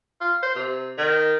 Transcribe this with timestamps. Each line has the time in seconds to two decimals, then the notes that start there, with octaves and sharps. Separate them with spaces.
0.21 F4
0.43 C5
0.55 C3
0.98 D#3